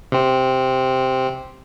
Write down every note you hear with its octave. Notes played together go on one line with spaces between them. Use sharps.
C3 C4